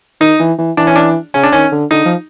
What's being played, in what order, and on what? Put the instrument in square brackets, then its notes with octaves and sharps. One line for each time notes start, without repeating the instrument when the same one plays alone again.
[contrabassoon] D#3 [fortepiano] D#4
[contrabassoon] E3
E3
[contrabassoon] E3 [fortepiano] D4
[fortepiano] C#4
D4
[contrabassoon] C#3 [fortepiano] C#4
[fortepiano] D4
[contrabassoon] D#3 [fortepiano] C#4
[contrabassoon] D3
[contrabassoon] D3 [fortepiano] D#4
[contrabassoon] F3